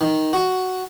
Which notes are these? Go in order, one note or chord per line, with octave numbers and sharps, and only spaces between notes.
D#3
F#4